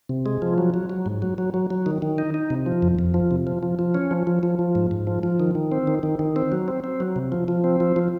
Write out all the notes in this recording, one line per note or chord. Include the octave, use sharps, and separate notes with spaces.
C3
G#3
F3
F#3
F#3
F#3
G#2
F#3
F#3
F#3
F#3
D#3
D#3
D#4
D#4
C3
F3
F2
F2
F3
C3
F3
F3
F3
C#4
F3
F3
F3
F3
G#2
G#2
F3
F3
D#3
D#3
C4
D#3
D#3
D#3
C4
F#3
C4
C4
F#3
C3
F3
F3
C4
F3
F3